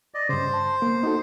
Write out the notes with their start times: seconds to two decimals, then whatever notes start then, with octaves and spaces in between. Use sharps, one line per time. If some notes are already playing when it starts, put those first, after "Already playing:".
0.14 D5 D#5
0.29 G2 C#3 C5
0.54 A5
0.82 A#3 B3
1.03 D#4 F#4 A4